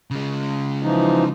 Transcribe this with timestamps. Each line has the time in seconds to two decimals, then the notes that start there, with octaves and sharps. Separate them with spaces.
0.11 C#3 G#3
0.83 E3 F3 D#4